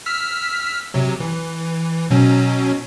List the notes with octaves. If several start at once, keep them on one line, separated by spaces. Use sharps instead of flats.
E6 F6 B6
C3 F#3
E3
B2 F#3 C#4